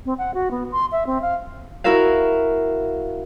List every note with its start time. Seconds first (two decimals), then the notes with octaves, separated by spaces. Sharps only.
0.05 C4
0.18 F#5
0.34 F#4
0.51 B3
0.72 C6
0.92 E5
1.07 C4
1.22 F5
1.84 E4 F#4 A#4 E5 F5